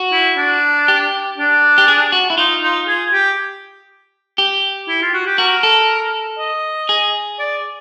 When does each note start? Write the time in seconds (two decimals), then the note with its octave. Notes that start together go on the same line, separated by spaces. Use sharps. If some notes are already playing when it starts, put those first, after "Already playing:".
Already playing: F#4
0.12 E4
0.37 D4
0.88 G4
1.38 D4
1.78 G4
1.88 G#4
2.12 F#4
2.30 E4
2.38 D#4 F4
2.63 D#4
2.88 G#4
3.13 G4
4.38 G4
4.88 E4
5.02 F4
5.14 F#4
5.26 G4
5.38 F#4 A#4
5.63 A4
6.39 D#5
6.89 G#4
7.39 D5